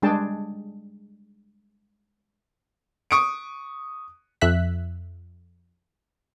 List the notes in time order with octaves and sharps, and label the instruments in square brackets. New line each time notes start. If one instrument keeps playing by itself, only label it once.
[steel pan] G3 G#3 D4 G#4 G5 A5
[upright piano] C#6 D#6 C#7 D7
[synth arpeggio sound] F2 E5 F#6 B6